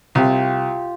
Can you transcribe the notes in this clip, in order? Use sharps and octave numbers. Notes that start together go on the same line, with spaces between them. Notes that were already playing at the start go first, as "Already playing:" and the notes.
C2 F4 G4